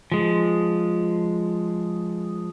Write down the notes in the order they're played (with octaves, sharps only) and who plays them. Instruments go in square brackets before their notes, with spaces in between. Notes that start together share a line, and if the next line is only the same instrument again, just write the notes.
[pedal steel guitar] F3 G#3